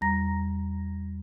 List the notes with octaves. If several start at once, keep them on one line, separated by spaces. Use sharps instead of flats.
E2 G3 A#5 A#6